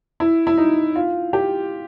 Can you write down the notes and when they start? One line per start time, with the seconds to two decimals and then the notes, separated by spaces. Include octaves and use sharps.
0.20 E4
0.47 E4
0.57 D#4
0.96 F4
1.33 G4